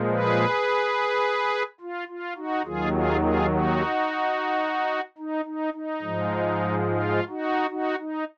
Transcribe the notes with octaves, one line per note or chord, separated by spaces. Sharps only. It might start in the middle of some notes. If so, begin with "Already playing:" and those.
Already playing: A#2 F3 G#3
G#4 B4
F4
F4
D#4 F#4
D#2 D#3 F#3 F4 G#4
F4 G#4
F4 G#4
D#4 F#4
D#4
D#4
D#4
G#2 F3 G#3
F4
D#4 F#4
D#4 F#4
D#4